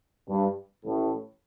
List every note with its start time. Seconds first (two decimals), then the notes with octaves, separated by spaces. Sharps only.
0.29 G2
0.85 A1 A2